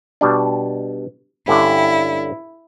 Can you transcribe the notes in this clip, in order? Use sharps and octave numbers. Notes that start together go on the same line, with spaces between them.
B2 G3 D4
G2 D3 C#4 E4